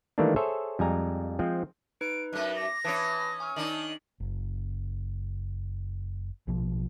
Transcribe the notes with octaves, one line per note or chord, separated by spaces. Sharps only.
D#3 E3 G3 A3 A#3 D4
G#4 A4 C5 C#5 E5
F2 G3 G#3 G#5 A#5
F3 G#3 C4
D#4 B4 D7
F#2 A3 F#6
D6 A#6
E3 C#4 B4 A5 D#6
G#5 C#6 F6
D#3 D4 D#4 F#7
F#1
A#1 B2 F3